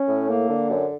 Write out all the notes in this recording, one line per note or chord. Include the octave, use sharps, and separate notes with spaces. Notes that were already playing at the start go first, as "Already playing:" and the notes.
Already playing: C#4
A2
A#3
D3
F#2